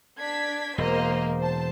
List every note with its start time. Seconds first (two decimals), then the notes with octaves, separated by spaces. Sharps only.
0.20 D4 G#6 B6
0.78 E1 A#3 C5 D#5
1.39 C5 A5